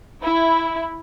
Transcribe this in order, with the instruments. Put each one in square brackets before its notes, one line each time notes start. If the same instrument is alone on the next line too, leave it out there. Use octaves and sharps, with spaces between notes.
[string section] E4